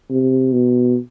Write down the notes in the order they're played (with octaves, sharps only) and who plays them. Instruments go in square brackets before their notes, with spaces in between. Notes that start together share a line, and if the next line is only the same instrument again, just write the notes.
[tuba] C3
B2